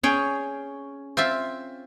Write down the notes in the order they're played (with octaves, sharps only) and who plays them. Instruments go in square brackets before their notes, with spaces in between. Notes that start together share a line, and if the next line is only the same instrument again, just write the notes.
[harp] C#4 [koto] G#4 C#5 G5
[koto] C4 F4 E5